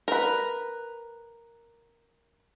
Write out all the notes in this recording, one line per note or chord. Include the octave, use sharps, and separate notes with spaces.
A#4 B4